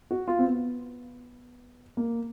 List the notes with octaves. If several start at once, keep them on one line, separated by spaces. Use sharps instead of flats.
F#4
F4
C4
B3
A#3